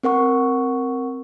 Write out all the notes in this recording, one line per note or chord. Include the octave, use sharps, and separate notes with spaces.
C4 A#4 F#5 C#6